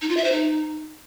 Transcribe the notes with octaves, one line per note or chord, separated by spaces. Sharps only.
D#4
F4
E5
C5
D#4